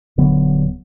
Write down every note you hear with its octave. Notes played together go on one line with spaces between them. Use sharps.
D#1 D3 F#3 B3